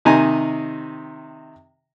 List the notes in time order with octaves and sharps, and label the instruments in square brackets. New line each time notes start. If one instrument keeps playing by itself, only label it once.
[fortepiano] C3 D#3 D#5 G#5 A#5